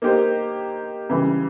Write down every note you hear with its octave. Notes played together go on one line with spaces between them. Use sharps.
A#3 D#4 G4 C5
C#3 E3 G3